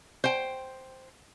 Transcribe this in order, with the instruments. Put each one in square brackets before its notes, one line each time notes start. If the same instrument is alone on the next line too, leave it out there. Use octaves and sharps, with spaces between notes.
[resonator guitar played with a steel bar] C5 G5